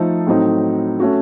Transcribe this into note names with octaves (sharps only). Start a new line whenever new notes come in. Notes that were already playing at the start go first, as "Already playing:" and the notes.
Already playing: F3 A3 D#4 A4 C5
A2 F#3 C4 D#4
A3 C#4 F#4